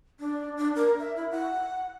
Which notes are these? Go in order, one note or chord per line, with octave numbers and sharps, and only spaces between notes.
D4
D4
A#4
E5
E4
F#5